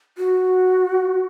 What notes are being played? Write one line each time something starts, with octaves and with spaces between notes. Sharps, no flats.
F#4